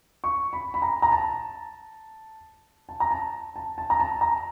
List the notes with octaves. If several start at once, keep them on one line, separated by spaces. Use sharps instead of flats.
C#6
B5
B5
A#5
A#5
A5
A5
A#5
A5
A5
A5
A#5
A5
A#5